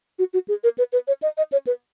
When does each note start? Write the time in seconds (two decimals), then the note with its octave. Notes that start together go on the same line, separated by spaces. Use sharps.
0.19 F#4
0.34 F#4
0.48 G#4
0.64 A#4
0.78 B4
0.93 B4
1.08 C#5
1.22 D#5
1.38 D#5
1.52 C#5
1.67 B4